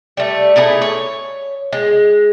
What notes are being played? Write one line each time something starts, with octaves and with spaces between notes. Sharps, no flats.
G3 A3
A3 D#4 E4 G#4
C#5
G#3